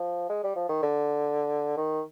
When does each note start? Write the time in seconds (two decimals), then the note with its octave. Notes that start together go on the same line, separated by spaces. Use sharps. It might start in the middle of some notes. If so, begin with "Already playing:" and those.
Already playing: F3
0.29 G#3
0.44 G3
0.56 F3
0.69 D#3
0.83 D3
1.77 D#3